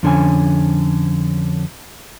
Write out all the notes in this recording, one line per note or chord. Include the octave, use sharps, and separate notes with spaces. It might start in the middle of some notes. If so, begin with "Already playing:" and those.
F2 D3 C#4 G#5